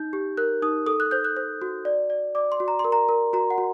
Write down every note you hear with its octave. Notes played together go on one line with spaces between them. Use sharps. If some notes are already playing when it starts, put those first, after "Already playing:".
Already playing: D#4 G6
G4
A#4 F#6
D#4 D#6
A4 D#6
F#6
C5 G6
F#6
C5
F#4
D5
D5
D5 D6
C6
F#4
A#5
C6
A#4
A#5
A#4
F#4 A#5
F#5
F#4